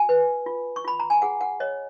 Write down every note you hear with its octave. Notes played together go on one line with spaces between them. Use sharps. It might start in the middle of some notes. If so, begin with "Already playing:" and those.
Already playing: F#4 G#5
B4
F4
C#6
F4 B5
A#5
G#5
G#4 F#5
F#5
C#5 D#5